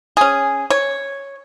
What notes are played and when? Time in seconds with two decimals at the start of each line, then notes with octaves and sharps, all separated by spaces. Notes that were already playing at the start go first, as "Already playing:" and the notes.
0.17 C#4 G#4
0.70 C#5